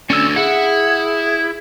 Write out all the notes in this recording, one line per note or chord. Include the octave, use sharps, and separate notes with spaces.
D2 D3 C#4 E6
E4 G#4 F#5